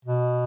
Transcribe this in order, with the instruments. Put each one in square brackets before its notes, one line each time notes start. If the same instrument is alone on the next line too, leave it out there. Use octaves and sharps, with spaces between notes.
[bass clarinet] B2